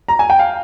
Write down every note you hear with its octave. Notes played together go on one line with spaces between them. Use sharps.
A#5
G#5
G5
F5